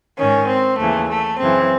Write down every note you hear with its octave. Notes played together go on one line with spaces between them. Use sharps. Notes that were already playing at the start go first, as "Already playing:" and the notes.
G#2 D#3 C#4
C4
D#2 C#3 E3 A3
A3
F#2 C#3 E3 C4